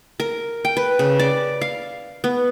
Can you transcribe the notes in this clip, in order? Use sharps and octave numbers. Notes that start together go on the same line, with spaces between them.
A#4
G5
B4
C#3
D5
F5
B3